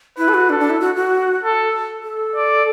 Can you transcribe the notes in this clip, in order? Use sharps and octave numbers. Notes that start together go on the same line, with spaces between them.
E4 B4
A4
F#4
D4 A4
D4
E4
F#4
F#4
A4
A4
D5